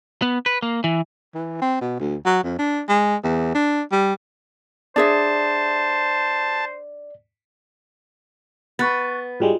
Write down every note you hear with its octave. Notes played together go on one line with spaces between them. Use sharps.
B3
B4
A#3
E3
E3
C4
B2
D2
F#3
F2
D4
G#3
E2
D4
G3
D4 G#4 C5 D5 E5 A5
B3 C#6 F#6 A6
G#2 G3 G#3 F4 F#4